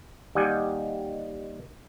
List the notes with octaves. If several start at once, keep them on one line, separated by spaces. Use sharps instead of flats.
D#2 G3 D#5 F#5 G#5